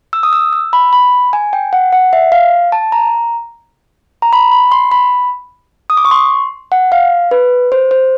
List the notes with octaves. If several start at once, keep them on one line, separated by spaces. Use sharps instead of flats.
E6
D#6
E6
E6
B5
B5
G#5
G5
F#5
F#5
E5
F5
A5
A#5
A#5
B5
B5
C6
B5
D#6
D6
C#6
C6
F#5
F5
B4
C5
C5